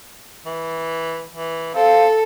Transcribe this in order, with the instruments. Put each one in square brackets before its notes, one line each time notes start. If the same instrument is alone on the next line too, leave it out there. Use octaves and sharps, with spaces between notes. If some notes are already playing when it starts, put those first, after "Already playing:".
[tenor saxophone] E3
E3
[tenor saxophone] C4 [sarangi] A4 [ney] F5